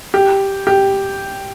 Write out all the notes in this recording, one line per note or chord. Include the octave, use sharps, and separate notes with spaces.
G4
G4